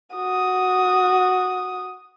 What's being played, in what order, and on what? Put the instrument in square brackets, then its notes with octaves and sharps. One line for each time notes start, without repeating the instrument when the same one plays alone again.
[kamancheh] F#4 D#6